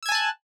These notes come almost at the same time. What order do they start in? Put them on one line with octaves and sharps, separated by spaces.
E6 G#6 G#5 A5 F#6